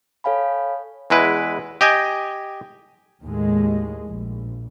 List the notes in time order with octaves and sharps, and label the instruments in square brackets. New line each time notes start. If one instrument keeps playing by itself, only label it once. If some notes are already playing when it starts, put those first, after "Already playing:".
[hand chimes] A4 C#5 F5 G#5 B5
[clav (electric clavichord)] E2 G#3 E4 B4
G4 D#5 G5 G#5
[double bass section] D#2 A2 G#3
A#1